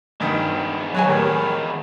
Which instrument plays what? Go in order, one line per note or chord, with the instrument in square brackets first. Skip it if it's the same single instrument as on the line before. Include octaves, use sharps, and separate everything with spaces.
[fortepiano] G2 D#3 [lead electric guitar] G#3 B3
[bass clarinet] F#3 [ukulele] B4 C#5 G#5
[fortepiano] A2 G3 [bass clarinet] D#3